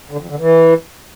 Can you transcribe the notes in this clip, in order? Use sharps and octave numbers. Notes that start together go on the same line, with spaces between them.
D3
F2
D3
E3